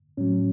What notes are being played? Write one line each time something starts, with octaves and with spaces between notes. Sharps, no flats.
A2 F#3 C#4